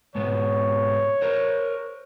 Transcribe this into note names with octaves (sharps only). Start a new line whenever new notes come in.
G#2 B2 B3 C#5
A#4 C5